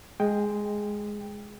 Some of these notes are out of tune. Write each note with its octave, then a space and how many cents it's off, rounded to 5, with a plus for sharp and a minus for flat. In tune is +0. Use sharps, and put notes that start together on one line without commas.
G#3 +0 G5 +15